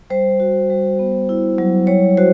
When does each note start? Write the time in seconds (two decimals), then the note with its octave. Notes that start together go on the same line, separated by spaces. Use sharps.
0.10 G3 C5
0.40 F#4
0.70 G3
0.99 B3
1.29 E4
1.58 F#3
1.87 G3 C#5
2.17 F#4 C5